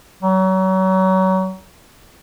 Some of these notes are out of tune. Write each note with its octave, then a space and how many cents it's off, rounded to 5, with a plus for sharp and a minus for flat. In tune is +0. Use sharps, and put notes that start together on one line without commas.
F#3 +30